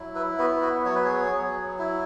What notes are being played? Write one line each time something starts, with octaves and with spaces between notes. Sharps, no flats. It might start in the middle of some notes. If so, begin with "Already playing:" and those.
Already playing: F#3 E4
B4 E5
B3 F#4 B4
F#4 B4
F#3 C#5
B4
G#4 C#5
F#3
E4